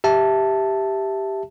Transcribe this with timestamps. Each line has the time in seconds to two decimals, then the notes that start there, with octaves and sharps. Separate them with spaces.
0.04 G4 E5 A5